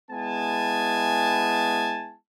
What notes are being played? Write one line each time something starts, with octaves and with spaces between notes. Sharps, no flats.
G#3 B3 E4 G#5 A5